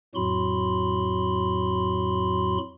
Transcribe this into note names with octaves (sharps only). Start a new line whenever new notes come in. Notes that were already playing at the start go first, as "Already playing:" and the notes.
F2 A2 F#3 F#4 B5 C6